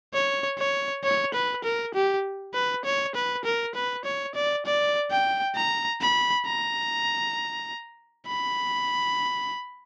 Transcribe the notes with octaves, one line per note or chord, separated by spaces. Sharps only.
C#5
C#5
C#5
B4
A#4
G4
B4
C#5
B4
A#4
B4
C#5
D5
D5
G5
A#5
B5
A#5
B5